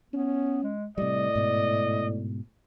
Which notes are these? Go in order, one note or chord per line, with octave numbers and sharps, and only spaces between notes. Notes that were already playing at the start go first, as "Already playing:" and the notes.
B3 C#4
G#3
A2 C3 G3 D5 D#5
G#2 B2